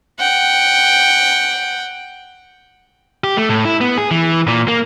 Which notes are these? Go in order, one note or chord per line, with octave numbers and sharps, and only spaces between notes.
F#5 G5
G4
A3
A2
E4
B3
G#4
E3
A#2
A#3